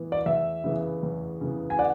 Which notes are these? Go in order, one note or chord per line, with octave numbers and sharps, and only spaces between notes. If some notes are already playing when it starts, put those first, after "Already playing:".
Already playing: A2 E3 B3
D5
E2 E5
C#3 E3 B3
E2
C#3 E3 B3
G#5
D5 F#5